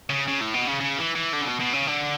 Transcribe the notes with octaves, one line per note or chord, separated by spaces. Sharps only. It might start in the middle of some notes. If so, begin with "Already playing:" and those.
C#3
C#3
A2
B2
C#3
C#3
E3
E3
D3
C#3
B2
B2
C#3
D3